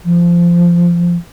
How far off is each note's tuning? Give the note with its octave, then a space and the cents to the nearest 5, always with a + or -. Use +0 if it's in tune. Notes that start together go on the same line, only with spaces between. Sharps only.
F3 -15